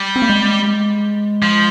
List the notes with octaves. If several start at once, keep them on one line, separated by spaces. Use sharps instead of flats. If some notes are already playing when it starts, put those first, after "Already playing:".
Already playing: G3
C4
A#3
G#3
F3